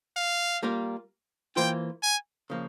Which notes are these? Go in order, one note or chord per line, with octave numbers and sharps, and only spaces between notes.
F5
G3 A#3 F4 A#4
E3 A#3 F4 C5 G5
G#5
C#3 F3 A#3